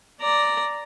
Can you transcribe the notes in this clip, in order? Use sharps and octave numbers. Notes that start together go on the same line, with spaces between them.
D5 A#5